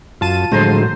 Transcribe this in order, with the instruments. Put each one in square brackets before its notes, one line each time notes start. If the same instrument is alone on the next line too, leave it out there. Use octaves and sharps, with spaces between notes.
[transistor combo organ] F#2 [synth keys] F4 A5 D#7
[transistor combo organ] A2 F#3 [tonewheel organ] D3 F3 G#3 [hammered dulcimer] C5 A#5 C6